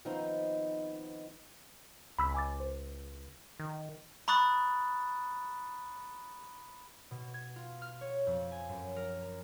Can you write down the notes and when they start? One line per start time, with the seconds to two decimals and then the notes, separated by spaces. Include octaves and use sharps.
0.05 D#3 F3 B3 C4 D#4
2.19 C#2 B5 E6 B6
2.35 G#5 D6 A6
2.60 C5
3.60 D#3
4.28 A#5 B5 C#6 D#6 F#6 A6
7.11 B2
7.34 G#6
7.56 F4
7.82 F6
8.01 C#5
8.27 F2
8.52 G#5
8.69 F#2
8.96 A#4
9.22 A#5